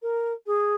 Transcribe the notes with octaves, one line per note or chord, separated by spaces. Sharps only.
A#4
G#4